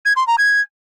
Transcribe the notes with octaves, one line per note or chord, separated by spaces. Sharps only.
G#6
C6
A#5
G#6